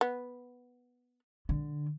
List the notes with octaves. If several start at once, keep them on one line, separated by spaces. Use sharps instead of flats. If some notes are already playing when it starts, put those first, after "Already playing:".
B3
D3